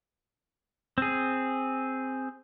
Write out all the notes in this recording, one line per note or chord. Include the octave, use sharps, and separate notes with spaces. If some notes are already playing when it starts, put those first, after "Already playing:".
C4 G#4